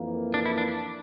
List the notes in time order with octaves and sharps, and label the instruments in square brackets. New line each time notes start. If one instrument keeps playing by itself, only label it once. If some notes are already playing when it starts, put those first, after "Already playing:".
Already playing: [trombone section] F2 E3 A#3
[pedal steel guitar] D4
E4
D4
D4